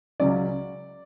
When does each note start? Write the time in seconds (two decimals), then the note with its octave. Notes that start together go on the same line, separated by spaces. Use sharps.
0.20 C#2 C#3 F#3 C#4 D5